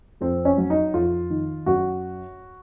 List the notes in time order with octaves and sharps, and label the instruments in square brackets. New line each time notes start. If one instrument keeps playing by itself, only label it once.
[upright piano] F2 C4
C#4
F#3
D#4
F2 F4
D#3
F#2 F#4